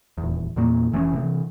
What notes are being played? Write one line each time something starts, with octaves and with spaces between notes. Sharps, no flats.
D#1 E2
E2 A#2 A#3
F1 E3 A3 C#4
C3 E3